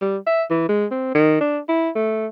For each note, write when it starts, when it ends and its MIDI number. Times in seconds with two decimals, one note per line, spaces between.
0.02 0.17 55
0.27 0.43 76
0.50 0.65 52
0.69 0.86 56
0.91 1.14 60
1.15 1.39 51
1.41 1.59 62
1.69 1.90 64
1.95 2.27 57